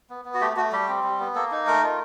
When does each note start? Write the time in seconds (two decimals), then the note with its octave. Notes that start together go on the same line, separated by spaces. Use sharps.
0.10 B3
0.25 B3
0.34 F#4
0.41 A3 G4
0.56 A3 F#4
0.72 G3 G4
0.88 C4
1.04 G3
1.20 B3
1.35 A#3 A4
1.51 D#4
1.67 A3 A#4
1.83 F4